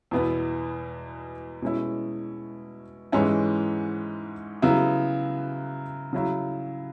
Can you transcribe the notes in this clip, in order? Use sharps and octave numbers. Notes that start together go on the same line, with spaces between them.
E2 B2 B3 E4
B2 G#3 C#4 E4
G#2 E3 G#3 C#4 E4
C#3 F#3 B3 E4
C#3 F#3 E4